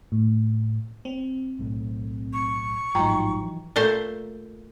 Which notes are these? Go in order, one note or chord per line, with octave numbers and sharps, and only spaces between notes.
A2
C4
B1 A2
C#6
A1 G#2 F3 F#3 D#4 G5 A#5
E3
A#2 A3 C5